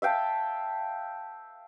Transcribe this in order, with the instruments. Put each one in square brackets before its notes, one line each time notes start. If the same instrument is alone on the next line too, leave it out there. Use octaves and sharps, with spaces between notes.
[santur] E5 F5 G5 A5